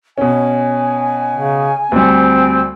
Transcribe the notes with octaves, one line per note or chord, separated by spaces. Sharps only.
B2 C#4 G#5
C#3
D2 G3 C4